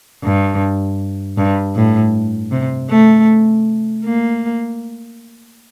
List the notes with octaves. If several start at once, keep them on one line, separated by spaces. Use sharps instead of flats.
G2
G2
A2
C3
A3
A#3